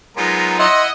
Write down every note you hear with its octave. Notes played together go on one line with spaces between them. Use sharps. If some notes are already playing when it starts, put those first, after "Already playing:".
F#3 G#3 B3 D#4 F4 A#4
E4 D#5 F#5 C6 E6